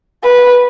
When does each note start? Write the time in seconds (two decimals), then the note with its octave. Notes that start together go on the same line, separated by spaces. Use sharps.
0.23 B4